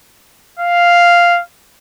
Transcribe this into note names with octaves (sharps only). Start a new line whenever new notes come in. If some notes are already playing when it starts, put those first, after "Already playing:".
F5